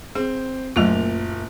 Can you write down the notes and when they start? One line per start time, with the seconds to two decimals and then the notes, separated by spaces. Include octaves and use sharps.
0.15 C4 G#4
0.76 F#1 A#2 F#3 A3 F4 F7